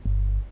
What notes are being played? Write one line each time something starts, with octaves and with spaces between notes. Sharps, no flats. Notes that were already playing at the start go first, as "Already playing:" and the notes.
G1